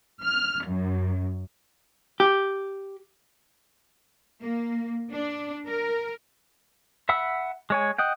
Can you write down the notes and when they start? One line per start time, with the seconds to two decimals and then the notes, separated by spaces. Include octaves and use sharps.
0.22 F6
0.65 F#2
2.20 G4
4.42 A#3
5.12 D4
5.67 A#4
7.09 E5 F#5 B5 E6
7.70 G#3 C#5 G#5
7.98 D#5 F#5 G5